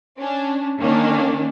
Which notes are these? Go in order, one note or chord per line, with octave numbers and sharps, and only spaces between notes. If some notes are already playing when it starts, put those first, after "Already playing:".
C#4 D4
D#3 A#3 C#4 D4